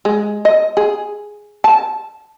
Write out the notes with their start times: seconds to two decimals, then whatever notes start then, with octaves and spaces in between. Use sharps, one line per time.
0.05 G#3
0.45 D#5
0.77 G#4
1.64 A5